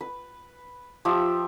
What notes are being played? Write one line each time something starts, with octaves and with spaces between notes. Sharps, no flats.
B4
F3 G4 E5